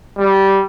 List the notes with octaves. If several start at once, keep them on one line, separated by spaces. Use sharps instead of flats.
G3